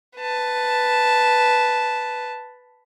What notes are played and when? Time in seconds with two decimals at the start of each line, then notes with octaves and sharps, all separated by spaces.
0.18 B4 A5